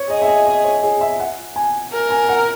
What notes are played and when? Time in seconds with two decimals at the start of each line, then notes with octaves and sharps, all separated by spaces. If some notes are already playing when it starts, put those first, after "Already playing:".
Already playing: C#5
0.10 G#4 D#5
0.22 E5
0.28 D#5
0.46 D#5
0.64 C#5
0.83 G#4
1.01 E5
1.20 F#5
1.56 G#5
1.93 A#4
2.10 G#5
2.29 F#5